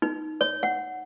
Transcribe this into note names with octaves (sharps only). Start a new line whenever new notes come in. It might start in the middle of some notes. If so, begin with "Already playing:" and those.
D#4
C#5
F#5